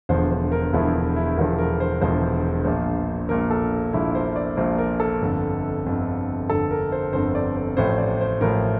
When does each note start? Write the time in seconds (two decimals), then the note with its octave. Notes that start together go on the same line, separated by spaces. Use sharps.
0.09 E1 E2 D3 F3 C5
0.31 C5
0.52 A#4
0.73 E1 E2 D3 F3 E4
1.16 E4
1.37 E1 E2 D3 F3 A#4
1.59 A#4
1.80 C5
2.01 E1 E2 D3 F3 C5
2.65 A#1 A#2 F3
3.29 A#1 A#2 F3 A#4
3.51 A4
3.93 A#1 A#2 F3 E4
4.15 C5
4.36 D5
4.57 A#1 A#2 F3 C5
4.78 A#4
5.00 A4
5.21 G1 F2 D3
5.86 G1 F2 D3
6.49 G1 F2 D3 A4
6.71 A#4
6.92 C5
7.13 G1 F2 D3 C5
7.35 D5
7.56 C5
7.77 A1 A2 F3 C5
7.98 D5
8.20 C5
8.41 A1 A2 F3 A#4